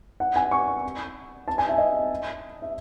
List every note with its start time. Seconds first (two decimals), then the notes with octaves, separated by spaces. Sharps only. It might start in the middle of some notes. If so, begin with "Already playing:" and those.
0.20 F#5
0.36 G#5
0.51 C#6
1.48 A5
1.58 G#5
1.69 E5
1.78 D#5
2.62 E5